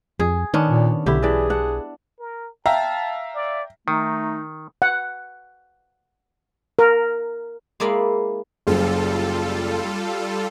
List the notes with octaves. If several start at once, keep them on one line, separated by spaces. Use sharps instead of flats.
F2 G#4
D#3 B3 C#4 D4
A#2
B1 D3 E4 G4
E3 D4 G#4 D5
D4 F#5
A#4
E5 F5 G5 A5 A#5
D5
D#3 A3 D#4
F#5
A#4
G#3 A#3 E4 D5 F5 B5
F#1 G3 F4 A4